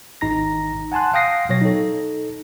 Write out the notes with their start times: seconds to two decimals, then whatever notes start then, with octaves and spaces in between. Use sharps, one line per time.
0.21 G#1 D#4 A#5 A#6
0.92 F#5 G#5 A5 C6 F#6
1.13 F5 G5 D#6 A#6 C7
1.49 B2 F#3 C#5 A#6
1.61 D#4 A4